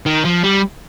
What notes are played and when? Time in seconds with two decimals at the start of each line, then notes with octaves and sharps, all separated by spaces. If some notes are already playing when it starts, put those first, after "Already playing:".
0.06 D#3
0.25 F3
0.44 G3